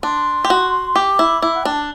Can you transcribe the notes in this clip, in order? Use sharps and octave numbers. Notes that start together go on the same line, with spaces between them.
D4 C6
G4
F#4
G4 D6
E4
E4 D6
F#5
D4 G5
A5